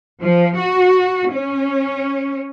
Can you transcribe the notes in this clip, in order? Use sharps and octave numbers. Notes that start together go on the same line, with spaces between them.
F3
F#4
C#4